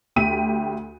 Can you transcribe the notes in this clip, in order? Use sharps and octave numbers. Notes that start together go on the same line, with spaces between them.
D2 G4 B6 D#7